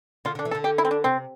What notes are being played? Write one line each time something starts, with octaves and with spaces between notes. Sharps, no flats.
D3 F4
D3 D4
E3
A4
D3
G4
E4
C4
D4
C3 C4